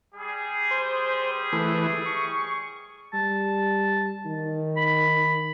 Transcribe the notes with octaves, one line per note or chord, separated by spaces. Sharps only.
G3 G#4
C5
E3 A3
C#6
G3 A5
D#3
B5